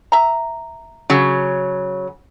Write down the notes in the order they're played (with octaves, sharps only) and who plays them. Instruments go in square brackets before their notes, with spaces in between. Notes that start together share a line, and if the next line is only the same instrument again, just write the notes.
[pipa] E5 A#5
[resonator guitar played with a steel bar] C#3 F#3